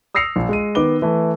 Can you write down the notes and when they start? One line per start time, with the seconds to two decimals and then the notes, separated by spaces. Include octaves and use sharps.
0.15 D#6 E6 A#6 C7 C#7 F7
0.36 A#1
0.49 G#3 D#7
0.75 D#3 B3 D6 G7
1.02 E3 A3